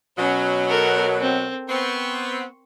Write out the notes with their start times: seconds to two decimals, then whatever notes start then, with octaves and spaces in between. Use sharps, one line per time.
0.18 B2 F#3 C#4
0.69 A4 A#4
1.21 C4
1.69 B3 C4 C6 C#6